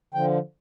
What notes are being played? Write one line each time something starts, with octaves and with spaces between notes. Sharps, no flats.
D3 F3 G5